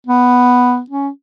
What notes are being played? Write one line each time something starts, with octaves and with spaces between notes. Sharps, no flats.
B3
C#4